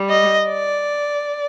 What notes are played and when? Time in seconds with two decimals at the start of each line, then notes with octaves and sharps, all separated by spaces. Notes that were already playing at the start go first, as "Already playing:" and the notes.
Already playing: G3
0.09 D#5
0.48 D5